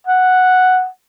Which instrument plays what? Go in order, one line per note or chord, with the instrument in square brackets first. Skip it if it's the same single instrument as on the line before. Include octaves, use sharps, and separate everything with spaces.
[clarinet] F#5